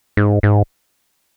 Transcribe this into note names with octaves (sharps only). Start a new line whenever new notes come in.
G#2
G#2